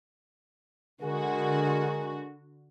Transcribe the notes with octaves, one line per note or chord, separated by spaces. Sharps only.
D3 G#3 F#4 G#4 A#4